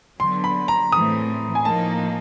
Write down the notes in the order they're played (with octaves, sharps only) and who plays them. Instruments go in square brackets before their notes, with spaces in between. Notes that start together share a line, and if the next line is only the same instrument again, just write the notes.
[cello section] D3 F#3 B3 [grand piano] C6
[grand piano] B5
A#5
[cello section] A2 E3 A3 C4 [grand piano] D#6
[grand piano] G#5
[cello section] A2 F3 A#3 D#4 [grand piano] A5